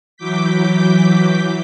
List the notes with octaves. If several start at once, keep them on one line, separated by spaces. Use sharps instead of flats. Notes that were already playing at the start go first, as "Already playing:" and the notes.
E3 F#3 D6 G6 B6